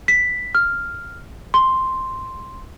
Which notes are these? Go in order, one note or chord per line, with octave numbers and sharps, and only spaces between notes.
B6
F6
C6